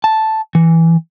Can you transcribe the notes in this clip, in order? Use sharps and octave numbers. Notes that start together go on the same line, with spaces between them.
A5
E3